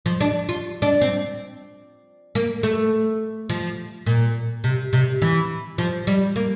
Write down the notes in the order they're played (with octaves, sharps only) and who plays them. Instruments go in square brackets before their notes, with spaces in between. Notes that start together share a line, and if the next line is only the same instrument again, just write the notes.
[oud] F3
D4
F4
D4
C4
A#3
A3
F3
A#2
C3
C3
E3
F3
G3
A#3